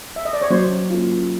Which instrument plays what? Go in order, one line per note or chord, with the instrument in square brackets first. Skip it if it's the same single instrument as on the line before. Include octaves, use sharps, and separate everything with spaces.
[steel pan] E5
D#5
D5
C#5
[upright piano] F#3 [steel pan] C5
[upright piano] A#3 C#4 F4